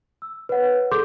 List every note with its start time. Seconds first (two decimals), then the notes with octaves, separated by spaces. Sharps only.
0.22 E6
0.49 B4 C#5 F#5
0.91 G#4 A4 C6 D6 G6